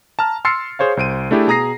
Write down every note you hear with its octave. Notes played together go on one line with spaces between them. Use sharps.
A5 A#5 F6
C6 E6 F6 A6 C7 C#7
G#4 C5 C#5 F5
C2 C5 D7 D#7
A3 D4 E4 G4 G#4
B2 G#4 A#5 D#6 A#6 C7